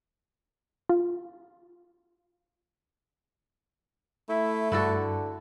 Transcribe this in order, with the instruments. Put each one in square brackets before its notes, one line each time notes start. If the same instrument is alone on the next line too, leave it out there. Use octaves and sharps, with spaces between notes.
[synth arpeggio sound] F4
[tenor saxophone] A3 [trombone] E4
[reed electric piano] G2 [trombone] D3 [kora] E4 F#4 A4